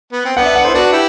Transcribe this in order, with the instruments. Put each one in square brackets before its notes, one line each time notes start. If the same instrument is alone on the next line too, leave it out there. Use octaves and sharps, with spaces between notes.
[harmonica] B3
C4
[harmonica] B3 D4 [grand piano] F#5
[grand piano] E5
F#5
[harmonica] E4 [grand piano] C5
[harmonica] D4 F#4 [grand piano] B4
[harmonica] E4 G4